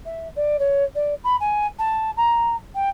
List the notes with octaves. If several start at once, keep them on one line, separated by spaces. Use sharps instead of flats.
E5
D5
C#5
D5
B5
G#5
A5
A#5
G5